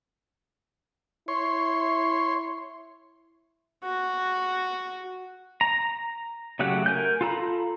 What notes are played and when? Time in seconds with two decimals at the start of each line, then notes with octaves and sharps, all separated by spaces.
1.28 E4 C#5 C6
3.84 F#4
5.61 A#5
6.59 C#3 F#3 A3 G4 F#5
6.86 A#4 G#5 G6
7.21 F4 A4 A#5 B5